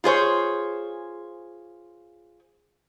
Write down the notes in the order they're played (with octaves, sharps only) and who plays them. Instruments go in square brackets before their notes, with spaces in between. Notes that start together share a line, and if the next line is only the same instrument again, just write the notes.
[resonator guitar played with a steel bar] F4 G#4 C5 C#5